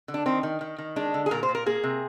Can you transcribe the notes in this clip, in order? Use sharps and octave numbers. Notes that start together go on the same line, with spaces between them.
D3
D4
D#3 C4
D#3
D#3
D#3
G#3 D4
D3
G#4
A#2 A#4
C5
A#2
A#4
A#3 G#4
C3